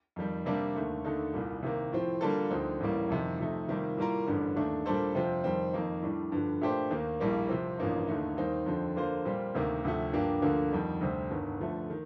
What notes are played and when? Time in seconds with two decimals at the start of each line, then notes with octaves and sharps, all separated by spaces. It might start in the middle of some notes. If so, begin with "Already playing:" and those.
0.16 F2 D#3 G3
0.46 C3 G3 A#3 D4
0.75 D#2 D3 A3
1.05 D#2 D3 A3 D#4 A4
1.34 C2 A#2 G3
1.63 C3 D#3 A#3
1.92 A2 F3 C4
2.21 D3 G3 A#3 F4 A4
2.51 D2 D3 F3 C4 D#4
2.80 A1 A2 G3 A#3
3.09 F2 C3 D#3
3.39 C3 F3 A3 D#4
3.68 C3 D#3 G3 A#3 F4
3.97 A2 G3 A#3 F4 A#4
4.27 A1 G2 D3 G3
4.56 D#2 D#3 A3 D4 A4
4.86 A#2 G3 D4 A4 C5
5.14 F2 C3 F3 C4 F4
5.44 F2 D#3 G3 C4
5.73 F2 D#3 A#3 D#4
6.02 A2 G3 D4
6.32 G2 D3 F3
6.61 A#2 A3 D4 G4 C5
6.91 D#2 D#3 A#3
7.20 A#1 A2 G3 A#3
7.49 C3 F3 C4
7.78 A1 G2 F3 A#3 D#4
8.08 D#2 D3 A3 D#4
8.37 D#2 D#3 G3 C4 D#4
8.66 F2 D3 F3 C4
8.96 D3 F3 A#3 F4 C5
9.25 A#2 G3 C4 F4
9.54 D2 C3 D#3 A#3
9.84 D2 C3 F3 A3
10.13 G2 F3 A#3 D4 G4
10.42 D2 D3 F3 A#3
10.72 F2 D#3 G3
11.01 D2 C3 G3 C4
11.31 G1 G2 D#3
11.60 D3 F3 A3
11.90 D#3